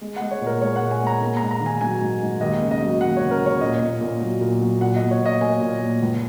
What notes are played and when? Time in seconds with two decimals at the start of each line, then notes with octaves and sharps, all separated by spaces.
0.01 G#3
0.16 G#3 F#5
0.31 C#5
0.41 A#2
0.46 A#4
0.61 G#3 C#5
0.76 F#5
0.82 A#2
0.91 G#5
1.01 G#3
1.07 A#5
1.21 A#3
1.37 G#2 A#5
1.51 A#5
1.61 D#3
1.66 G#5
1.81 F#3 G#5
2.01 G#2
2.21 G#2
2.41 D#2 D#5
2.61 C#3
2.71 D#5
2.81 F#3
3.01 D#2 F#5
3.17 C#3 C#5
3.31 A#4
3.42 C#3 C#5
3.61 A#2 D#5
3.81 A#2
4.01 A#2
4.21 F#3
4.41 A#2
4.61 F#3
4.81 A#2 F#5
4.96 D#5
5.01 A#2
5.11 C#5
5.21 A#2 D#5
5.41 A#3 G#5
5.61 A#2
5.81 A#2
6.01 C#2